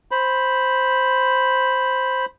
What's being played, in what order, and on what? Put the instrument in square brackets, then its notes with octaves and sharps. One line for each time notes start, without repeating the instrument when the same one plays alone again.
[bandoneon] C5 B5